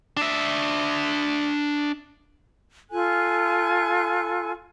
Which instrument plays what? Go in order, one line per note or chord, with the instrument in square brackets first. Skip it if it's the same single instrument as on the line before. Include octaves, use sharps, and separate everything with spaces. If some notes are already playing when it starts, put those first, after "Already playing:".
[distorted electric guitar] D4 E5
[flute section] F4 A4 G#5 F#6